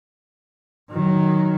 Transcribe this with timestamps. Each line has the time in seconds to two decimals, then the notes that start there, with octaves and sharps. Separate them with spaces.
0.91 D#3 F#3